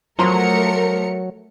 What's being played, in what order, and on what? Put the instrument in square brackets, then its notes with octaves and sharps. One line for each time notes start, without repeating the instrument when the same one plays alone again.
[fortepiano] F3 A#5 C6 [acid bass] F#3 [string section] A3 A#4 C#7